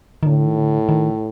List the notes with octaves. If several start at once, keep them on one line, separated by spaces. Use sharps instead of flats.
D#3
A2 D3
D#3
D3
D#3